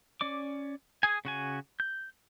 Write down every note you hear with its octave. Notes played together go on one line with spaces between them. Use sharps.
C#4 D5 D6
G#4 G#5
C#3 F#4 G#5
G6